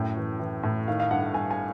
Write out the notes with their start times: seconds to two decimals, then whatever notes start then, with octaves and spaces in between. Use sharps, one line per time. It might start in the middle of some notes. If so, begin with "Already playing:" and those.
Already playing: F#2 A2 G5
0.17 E3
0.40 E3
0.63 A2
0.88 D#3 F5
1.00 F5
1.11 G2 F#5
1.23 F#5
1.34 G2 G#5
1.51 G#5